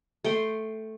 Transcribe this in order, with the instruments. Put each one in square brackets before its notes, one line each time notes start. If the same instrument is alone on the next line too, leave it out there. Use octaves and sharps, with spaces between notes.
[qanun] A3 G5 C6